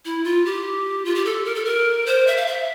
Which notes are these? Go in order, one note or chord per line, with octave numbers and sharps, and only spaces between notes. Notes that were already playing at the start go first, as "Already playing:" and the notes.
E4
F4
G4
F4
G4
A4
A#4
A4
A#4
C5
E5
F5
E5